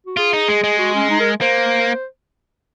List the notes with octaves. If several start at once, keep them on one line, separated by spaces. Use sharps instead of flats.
F#4
F4 G#4
D#4
G#3
G#3
F#4
C#4
D#4
A#4
A#3 C5